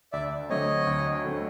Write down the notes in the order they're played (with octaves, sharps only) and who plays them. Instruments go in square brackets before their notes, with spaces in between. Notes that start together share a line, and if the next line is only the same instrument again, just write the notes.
[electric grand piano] D2 [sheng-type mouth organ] D5 E5
[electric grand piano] D3 F#3 A3 C4 [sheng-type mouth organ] C#5 D#5
[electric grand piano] D2
D3 F#3 A3 C4